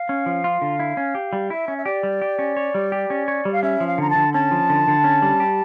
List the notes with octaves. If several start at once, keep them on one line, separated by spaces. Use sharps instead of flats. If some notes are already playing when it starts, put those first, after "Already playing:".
Already playing: F5
C#4
F3
F4
D3
E4
C#4
G4
G3
E4 E5
C#4
E5
G4 D5
G3
G4
C#4
C#5
G3
G4
C#4
C#5
G3
F5
C#4 E5
F3
F5
D3 A#5
A5
D3
C#4 A5
F3
D3
D3
C#4
G3
G4